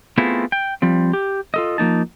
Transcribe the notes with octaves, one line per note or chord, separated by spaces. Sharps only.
A3 B3 C4 E4 F4 G#4
G5
F3 G3 C4
G4
F4 A4 D#5
F3 A#3 D#4 A5